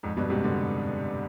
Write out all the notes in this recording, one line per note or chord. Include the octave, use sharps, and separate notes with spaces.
F2 G#2
G2 B2
G#2 C3
B2 D3